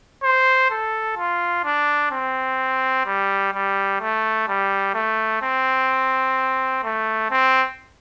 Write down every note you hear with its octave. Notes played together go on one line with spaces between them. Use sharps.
C5
A4
F4
D4
C4
G3
G3
A3
G3
A3
C4
A3
C4